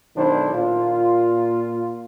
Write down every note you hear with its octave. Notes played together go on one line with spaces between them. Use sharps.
B1 D#3 D4 E4 C5
A#2 F4